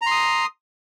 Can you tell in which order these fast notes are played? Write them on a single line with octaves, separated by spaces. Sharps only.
A#5 C6 D#6